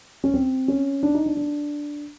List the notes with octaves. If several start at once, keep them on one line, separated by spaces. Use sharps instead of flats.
C#4
C4
C#4
D4
D#4
D4
D4